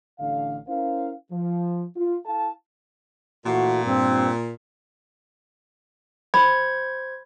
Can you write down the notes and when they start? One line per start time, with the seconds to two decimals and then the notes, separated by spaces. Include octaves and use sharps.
0.19 A1 D3 F5
0.68 C#4 E4 A#4 C5 F5
1.32 F3
1.96 F4
2.25 E4 A4 F5 A5
3.46 A#2 E3 A3 F#4
3.84 G2 C4
6.34 C5 B5 G#6